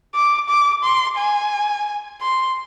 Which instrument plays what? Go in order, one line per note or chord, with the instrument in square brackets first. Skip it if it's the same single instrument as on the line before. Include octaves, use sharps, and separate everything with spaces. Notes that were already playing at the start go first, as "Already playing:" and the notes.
[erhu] D6
D6
C6
G#5
C6